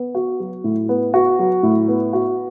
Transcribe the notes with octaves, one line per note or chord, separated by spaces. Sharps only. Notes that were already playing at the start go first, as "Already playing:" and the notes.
Already playing: B3
F#4
F#3
A2
B3
F#4
F#3
A2
B3
F#4